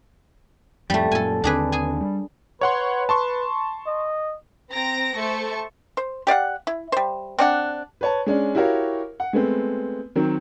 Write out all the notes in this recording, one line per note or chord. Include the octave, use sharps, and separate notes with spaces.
F2 A2 G3 A3
F#2 A#2 A4 G#5
D#2 D3 C4 D4 G#4 B4
G#4 G#5
G3
B4 C#5 F#5 C6
A5 C6 C#6
D#5
C4 A#5 A#6 D7
A3 A4 C5 A5 C#6
C5
G4 D5 F5 F#5
E4
G3 C5
C4 D4 F#5
B4 C#5 A5
G#3 C#4 D4
E4 F#4 G4 A#4 C#5 F5
F#5
G#3 A3 B3 C4
D#3 F#3 C4